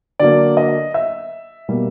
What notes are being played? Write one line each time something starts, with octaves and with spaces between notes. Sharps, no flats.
D3 F#3 A#3 D5
D#5
E5
B2 G3 A#3